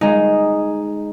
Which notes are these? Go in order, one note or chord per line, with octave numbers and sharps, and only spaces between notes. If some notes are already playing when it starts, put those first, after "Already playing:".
G#3 D#4